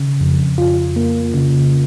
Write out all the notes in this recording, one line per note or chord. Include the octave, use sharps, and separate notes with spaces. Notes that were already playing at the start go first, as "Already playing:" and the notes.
Already playing: C#3
F2
F4
A#3
C#3